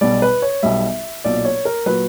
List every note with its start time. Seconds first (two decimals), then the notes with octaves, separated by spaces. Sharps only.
0.01 B1 B2 G3 D5
0.22 B4
0.42 C#5
0.63 B1 B2 G3 E5
1.24 B1 A#2 F#3 D5
1.45 C#5
1.65 A#4
1.86 A#2 F#3 B4